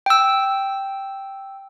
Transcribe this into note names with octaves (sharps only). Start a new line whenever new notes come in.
G5 E6